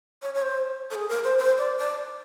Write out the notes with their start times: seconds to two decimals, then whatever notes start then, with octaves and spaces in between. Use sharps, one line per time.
0.22 C#5
0.34 C#5
0.42 C5
0.91 A4
0.95 G#4
1.09 A#4
1.24 C5
1.39 C5
1.58 D5
1.78 D5